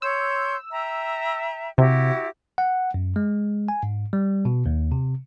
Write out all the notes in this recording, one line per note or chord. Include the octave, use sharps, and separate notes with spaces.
C#5 C6 E6 G6
E5 G5 A#5
C3 E4 F#4 G4
F#5
F#2
G#3
G#5
G#2
G3
B2
D#2
C3